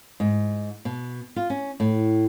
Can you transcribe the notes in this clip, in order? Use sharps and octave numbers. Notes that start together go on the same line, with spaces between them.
G#2
B2
F4
C#4
A2